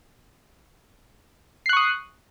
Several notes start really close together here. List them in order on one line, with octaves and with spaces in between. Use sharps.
C7 F#6 C#6 D#6